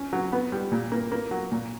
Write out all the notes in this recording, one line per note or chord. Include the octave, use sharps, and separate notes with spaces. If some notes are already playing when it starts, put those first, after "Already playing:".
Already playing: C#4
F#3
B3
G3
A#2
A#3
A#3
F#3
A#2